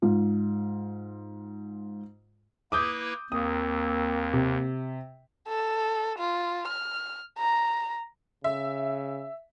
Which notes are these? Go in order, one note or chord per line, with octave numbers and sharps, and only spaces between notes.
G#2 F4
A#3 E4 B4 D6 D#6 G6
D#2 A#3 C4 D#6
C3
A4
F4
F6
A#5
C#3 E5